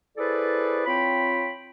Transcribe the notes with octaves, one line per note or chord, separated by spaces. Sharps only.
E4 G#4 A4 B4 C5 D5
C4 F4 C#5 G5 B5